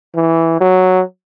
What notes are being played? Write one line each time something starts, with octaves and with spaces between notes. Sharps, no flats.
E3
F#3